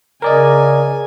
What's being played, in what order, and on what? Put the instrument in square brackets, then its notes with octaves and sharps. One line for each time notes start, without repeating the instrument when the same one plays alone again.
[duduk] C#3 [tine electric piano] A#4 D5 D#5 [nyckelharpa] G#5